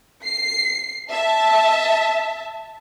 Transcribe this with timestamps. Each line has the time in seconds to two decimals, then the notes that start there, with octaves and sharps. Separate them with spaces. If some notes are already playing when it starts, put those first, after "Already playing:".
0.24 C7
1.11 E5 A5